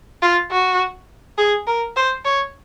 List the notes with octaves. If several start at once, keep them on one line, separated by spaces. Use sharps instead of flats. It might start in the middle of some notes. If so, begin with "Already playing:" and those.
F4
F#4
G#4
A#4
C5
C#5